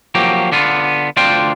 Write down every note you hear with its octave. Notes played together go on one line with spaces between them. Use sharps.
F3 F#3 A#3 G4
D3 B3 F4
D2 D4 F4 C5 G5